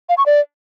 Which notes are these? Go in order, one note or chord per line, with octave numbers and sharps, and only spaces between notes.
F5
C#6
D5